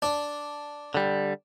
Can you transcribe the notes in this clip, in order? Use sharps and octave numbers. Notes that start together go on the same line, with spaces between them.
D4
D3 G3